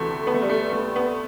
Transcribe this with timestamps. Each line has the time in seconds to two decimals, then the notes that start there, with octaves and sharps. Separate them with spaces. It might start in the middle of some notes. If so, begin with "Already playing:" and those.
Already playing: D2 C3 E3 A3
0.27 B3
0.34 A3
0.42 G3
0.49 A3
0.73 A3
0.96 B3